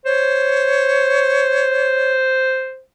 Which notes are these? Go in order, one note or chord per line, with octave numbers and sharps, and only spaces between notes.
C5 C#5